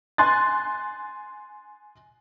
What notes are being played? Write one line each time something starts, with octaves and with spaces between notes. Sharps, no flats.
G#5 C6 F#6 A6